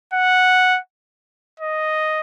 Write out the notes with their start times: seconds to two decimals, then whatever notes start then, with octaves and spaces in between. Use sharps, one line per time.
0.13 F#5
1.60 D#5